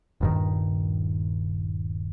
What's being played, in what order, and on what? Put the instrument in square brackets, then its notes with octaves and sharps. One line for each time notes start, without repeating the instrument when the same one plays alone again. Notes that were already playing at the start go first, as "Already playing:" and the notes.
[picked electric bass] D#1 G2 D#3